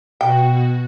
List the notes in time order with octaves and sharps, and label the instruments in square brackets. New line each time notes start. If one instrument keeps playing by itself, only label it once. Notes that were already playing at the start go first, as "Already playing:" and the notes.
[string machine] B2 F#4 [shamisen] G5